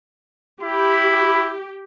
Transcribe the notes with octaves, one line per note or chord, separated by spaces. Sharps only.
E4 G4 B5